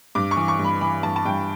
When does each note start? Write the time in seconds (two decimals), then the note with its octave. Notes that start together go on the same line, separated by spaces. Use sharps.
0.15 G2 D6
0.31 C#6
0.36 E3
0.48 C#6
0.59 G2
0.64 B5
0.81 E3 B5
1.03 G2 A5
1.16 A5
1.25 G2 G5